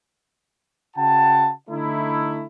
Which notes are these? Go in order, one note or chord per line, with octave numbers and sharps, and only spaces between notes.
C#3 F#4 F#5 G5 A5
D3 A3 D#4 E4